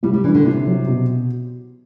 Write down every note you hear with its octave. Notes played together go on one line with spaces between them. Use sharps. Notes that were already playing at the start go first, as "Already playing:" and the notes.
C2 G3
G3
E3 D4
D3
C2 C3
F#3
B2